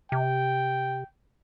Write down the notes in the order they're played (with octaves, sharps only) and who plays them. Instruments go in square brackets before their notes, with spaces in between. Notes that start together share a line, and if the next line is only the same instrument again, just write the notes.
[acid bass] C3 [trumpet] G5